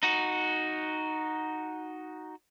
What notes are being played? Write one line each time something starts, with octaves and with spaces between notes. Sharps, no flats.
D#4 F#4